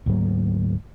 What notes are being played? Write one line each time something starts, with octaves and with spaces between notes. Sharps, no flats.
D2 G#2 F#3 A#3